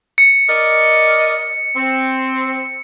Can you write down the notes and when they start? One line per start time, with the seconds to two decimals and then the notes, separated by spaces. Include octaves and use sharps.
0.18 C#7
0.48 A#4 D5 D#5
1.75 C4